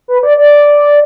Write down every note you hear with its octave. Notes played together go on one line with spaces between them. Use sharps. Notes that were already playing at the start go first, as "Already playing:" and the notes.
B4
D5
D5